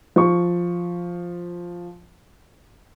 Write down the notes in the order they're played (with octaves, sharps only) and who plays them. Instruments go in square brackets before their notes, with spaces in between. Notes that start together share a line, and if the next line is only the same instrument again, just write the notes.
[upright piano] F3 C#6